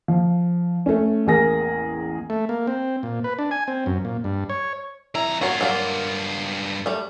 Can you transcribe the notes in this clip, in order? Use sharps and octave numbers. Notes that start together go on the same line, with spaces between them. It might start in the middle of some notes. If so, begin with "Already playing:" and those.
F3
A3 C#4
A1 E2 A#3 G#4 A#4 A#6
A3
A#3
C4
A#2
B4
D4
G#5
C4
F#2
A#2
G2
C#5
F2 E4 A#5
G2 F4 F#4 C#5
F#3 A#3 D5
G3 A3